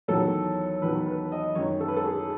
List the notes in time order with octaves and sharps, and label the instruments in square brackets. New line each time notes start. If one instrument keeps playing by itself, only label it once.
[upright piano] E2 D#3 F#3 A4
E2 D#3 F#3 B4
B4
D#5
F#2 D#3 G#3 C#5
A4
B4
A4
G#4